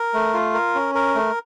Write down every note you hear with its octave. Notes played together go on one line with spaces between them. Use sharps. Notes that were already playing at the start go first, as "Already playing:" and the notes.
Already playing: A#4
A3
F4
A#4
C#4
A#4
A3